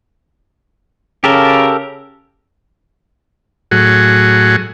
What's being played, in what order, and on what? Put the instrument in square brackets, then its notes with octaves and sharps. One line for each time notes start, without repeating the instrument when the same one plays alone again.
[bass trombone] C#3 [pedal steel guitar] G4 A4 A#4
[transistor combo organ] A2 F#3 F#4 G#4